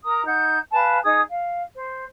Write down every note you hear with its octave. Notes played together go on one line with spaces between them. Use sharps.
A#4 A#5 D#6
D#4 F#5 G6
B4 F5 G#5 A5
D#4 G#4 D#6
F5
C5